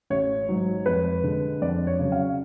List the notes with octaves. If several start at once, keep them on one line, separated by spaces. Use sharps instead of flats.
A1 C#5
G#2 F#3
F2 B4
D3 G#3
F2 D5
C#5
C#3 F#3
F5